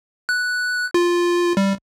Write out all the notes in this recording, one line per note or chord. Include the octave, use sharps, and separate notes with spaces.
F#6
F4
G3